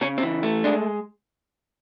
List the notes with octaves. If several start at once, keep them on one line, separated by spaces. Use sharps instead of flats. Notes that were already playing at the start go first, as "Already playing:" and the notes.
C#3 C#4
C4
E3
A3
G#3 D4